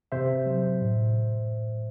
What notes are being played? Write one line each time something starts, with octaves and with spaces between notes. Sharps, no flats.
C3 C5 E5
F#3
A2